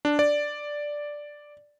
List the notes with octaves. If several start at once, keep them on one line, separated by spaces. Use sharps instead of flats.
D4
D5